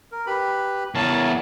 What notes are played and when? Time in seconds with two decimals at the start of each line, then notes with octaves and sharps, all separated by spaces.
0.12 A#4
0.27 G4 B4 B5
0.95 E2 A#4 C#5 A5